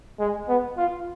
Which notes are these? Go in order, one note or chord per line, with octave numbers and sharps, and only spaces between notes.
G#3
B3
F4